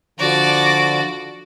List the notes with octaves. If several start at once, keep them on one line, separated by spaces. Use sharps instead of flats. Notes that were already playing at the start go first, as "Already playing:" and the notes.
D3 F3 F#4 D5 D6